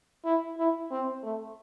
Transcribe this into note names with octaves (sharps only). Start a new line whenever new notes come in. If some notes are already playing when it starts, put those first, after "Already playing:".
E4
E4
C4
A3